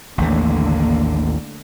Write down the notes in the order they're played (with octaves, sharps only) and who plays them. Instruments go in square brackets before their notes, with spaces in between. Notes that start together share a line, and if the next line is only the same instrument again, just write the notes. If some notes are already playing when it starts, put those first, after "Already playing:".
[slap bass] A1 D#2 E3 [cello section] A2 D3 A#3